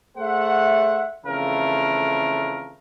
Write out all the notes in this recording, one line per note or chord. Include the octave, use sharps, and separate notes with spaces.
A3 G#4 C5 E5 F#5
F2 C#3 E3 A3 A#4 F5